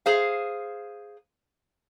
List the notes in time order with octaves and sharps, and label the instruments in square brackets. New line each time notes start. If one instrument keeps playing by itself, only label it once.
[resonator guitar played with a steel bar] G#4 C5 F5